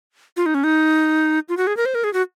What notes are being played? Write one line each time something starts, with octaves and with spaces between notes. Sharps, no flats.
F4
D#4
C#4
D#4
F4
F#4
G#4
A#4
C5
A#4
G#4
F#4